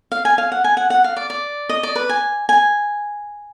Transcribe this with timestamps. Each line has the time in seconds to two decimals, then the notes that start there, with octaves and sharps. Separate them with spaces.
0.12 F5
0.25 G#5
0.38 F5
0.52 F#5
0.64 G#5
0.77 F#5
0.90 F#5
1.04 F5
1.17 D5
1.30 D5
1.69 D#5
1.83 D5
1.96 B4
2.09 G#5
2.49 G#5